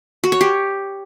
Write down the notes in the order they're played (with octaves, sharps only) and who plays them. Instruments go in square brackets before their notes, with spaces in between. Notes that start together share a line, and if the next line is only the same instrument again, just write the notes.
[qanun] F#4
C#5
G4